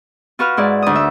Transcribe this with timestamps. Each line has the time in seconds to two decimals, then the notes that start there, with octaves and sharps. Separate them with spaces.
0.39 F4 F#4 B4 F6
0.57 G#2 E4 D5
0.82 D2 D#6
0.95 E5